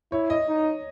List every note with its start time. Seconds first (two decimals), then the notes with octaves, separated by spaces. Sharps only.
0.12 E4 C#5
0.30 D#5
0.48 D#4